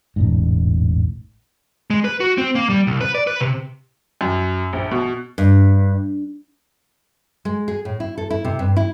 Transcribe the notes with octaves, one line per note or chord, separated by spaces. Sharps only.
E1 A1 G#2
G#3
B4
F#4
C4
A#3
G3
C2
B4
D5
B4
C3
F#2
A#1
B2
G2
G#3
G#4
A2
E4
A4
E4
C3
G2
E4